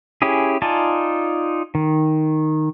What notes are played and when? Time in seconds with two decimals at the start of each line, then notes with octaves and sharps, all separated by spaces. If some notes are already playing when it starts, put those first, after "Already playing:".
0.22 C#4 E4 G4 G#4
0.62 D#4 F4 D5 G#5 A5
1.75 D#3